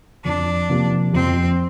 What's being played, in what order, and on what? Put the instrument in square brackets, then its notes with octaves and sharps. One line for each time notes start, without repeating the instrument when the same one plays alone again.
[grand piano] F2 [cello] D4
[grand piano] C3 F3 A#3
[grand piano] F2 [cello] C4